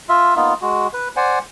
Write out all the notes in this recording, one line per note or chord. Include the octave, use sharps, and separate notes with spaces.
F4 E5
A#3 B3 D#4 F4
G#3 F#4
B4
C5 D5 F#5 G#5